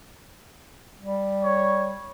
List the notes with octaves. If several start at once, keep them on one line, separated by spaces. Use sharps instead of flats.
G3
C#5